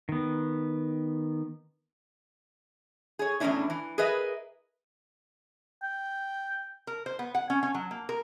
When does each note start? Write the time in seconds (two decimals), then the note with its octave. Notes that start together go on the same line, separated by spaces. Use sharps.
0.09 D#3 B3
3.19 G#4 C#5
3.40 E2 A2 D#3 C#4 D4 E4
3.70 E3
3.98 G#4 A#4 B4 D#5 E5
5.83 G5
6.87 A#4
7.06 C5
7.19 B3
7.35 F#5
7.50 C#4
7.63 C#4
7.75 F#3
7.91 A#3
8.09 A#4